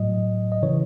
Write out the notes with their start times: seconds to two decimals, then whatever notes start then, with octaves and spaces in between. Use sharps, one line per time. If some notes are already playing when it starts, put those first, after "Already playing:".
Already playing: A2 F#3 D#5
0.52 D#5
0.62 C#3 E3 C#5